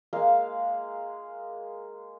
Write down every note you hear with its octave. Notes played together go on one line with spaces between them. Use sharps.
G#3 A#3 F5